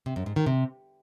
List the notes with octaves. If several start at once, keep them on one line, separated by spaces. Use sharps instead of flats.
C3
F#2
G#2
D#3
C3